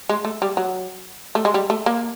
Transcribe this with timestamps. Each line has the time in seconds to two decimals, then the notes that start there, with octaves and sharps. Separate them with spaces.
0.09 G#3
0.25 A3
0.42 G3
0.57 F#3
1.35 A3
1.45 G#3
1.54 G3
1.70 A3
1.86 A#3